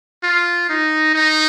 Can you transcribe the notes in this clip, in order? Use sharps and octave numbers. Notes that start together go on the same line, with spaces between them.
F4
D#4
D#4